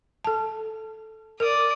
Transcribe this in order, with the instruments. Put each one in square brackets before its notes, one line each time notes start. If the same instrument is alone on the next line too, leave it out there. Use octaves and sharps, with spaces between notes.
[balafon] A4 A5
[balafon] A#4 [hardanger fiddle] D5 D#6